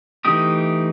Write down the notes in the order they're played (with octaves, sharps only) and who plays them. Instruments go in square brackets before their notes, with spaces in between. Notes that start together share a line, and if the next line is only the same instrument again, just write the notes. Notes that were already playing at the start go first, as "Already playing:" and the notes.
[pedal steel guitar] E3 A3 D#4 G4 D#6